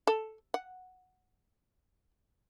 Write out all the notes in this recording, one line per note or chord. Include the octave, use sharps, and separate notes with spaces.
A4
F#5